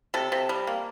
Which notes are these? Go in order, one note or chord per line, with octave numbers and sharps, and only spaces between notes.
C3 A4
C3
G3
A#3